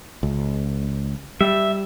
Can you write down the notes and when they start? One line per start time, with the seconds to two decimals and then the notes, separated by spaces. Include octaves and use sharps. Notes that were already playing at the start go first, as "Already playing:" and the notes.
0.23 C#2
1.41 G3 E5